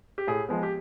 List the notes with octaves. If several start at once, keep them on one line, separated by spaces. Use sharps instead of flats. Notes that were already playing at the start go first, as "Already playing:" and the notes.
G4
A2 G#4
F3 G#3 B3
G4